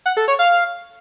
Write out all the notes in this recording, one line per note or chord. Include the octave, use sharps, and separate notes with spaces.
F#5
A4
C#5
F5